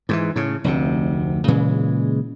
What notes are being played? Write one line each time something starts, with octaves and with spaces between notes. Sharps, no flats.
G#2 D#3 E3
A2 C#3
F1 D2 C3
A#2 C#3 E3 G#3